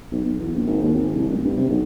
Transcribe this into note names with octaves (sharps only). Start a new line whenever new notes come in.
B1
B1
E2
A#1
G#1
D#2
G#1
C2
D1
G2
C3
B1